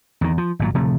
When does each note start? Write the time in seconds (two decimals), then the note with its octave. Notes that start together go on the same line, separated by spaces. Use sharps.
0.21 E2 D#3
0.38 F3
0.59 G#1 A#2 F#3
0.75 D1 C3 F3 A3